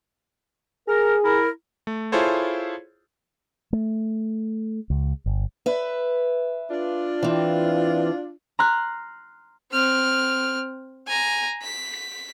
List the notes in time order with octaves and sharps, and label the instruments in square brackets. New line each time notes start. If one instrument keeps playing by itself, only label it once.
[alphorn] G#4 [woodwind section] A#4
[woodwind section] E4 A#4
[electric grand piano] A3
E4 F4 G#4 A4 C5 C#5
[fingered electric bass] A3
C#2
G1
[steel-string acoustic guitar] B4 E5
[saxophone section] D4 F4
[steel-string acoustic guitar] E3 C4
[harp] A#5 C6 F6 F#6
[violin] C4 F6
G#5 A#5
B6